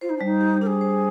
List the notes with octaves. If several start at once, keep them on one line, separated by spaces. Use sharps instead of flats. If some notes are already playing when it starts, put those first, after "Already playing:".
F4 C5
D#4
D4
G3 D#4
G4
D4 G#4 A#4
C5